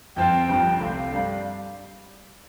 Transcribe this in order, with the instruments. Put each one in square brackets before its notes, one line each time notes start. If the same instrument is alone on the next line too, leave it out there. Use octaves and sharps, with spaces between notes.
[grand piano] F2 F3 C4 F4 [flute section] G5
[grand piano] G1 G2 F3
[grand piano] C2 C3 A3 C4 [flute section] F5
[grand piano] G2 G3 D4 G4